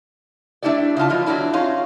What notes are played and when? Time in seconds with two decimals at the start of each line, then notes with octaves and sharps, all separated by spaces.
0.63 A3 D4 E4 G4 D5
0.97 C#3 D#4 F4 A5
1.09 F3 F#3 B3 F4 D#5
1.26 E2 F#3 A3 D4 E4
1.53 C#4 D#4 F4 G#4 C#5